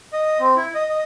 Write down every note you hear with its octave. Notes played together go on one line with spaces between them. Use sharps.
D#5
C4
E4
D#5
D#5